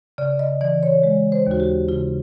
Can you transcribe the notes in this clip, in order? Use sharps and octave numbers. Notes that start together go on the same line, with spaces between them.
C#3 D5
D#5
E3 D5
C#5
G#3
C5
D#2 F#4
G4
C#3 F4